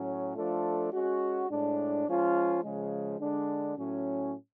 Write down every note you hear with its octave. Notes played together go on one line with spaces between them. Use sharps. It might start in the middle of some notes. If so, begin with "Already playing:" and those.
Already playing: A2 F#3 C#4
F3 A3 D4 F4 A4
G#3 C#4 F#4
A2 G#3 D4
F3 G#3 C#4 F4
C#3 F3 G#3
D3 G#3 D4
A2 F#3 C#4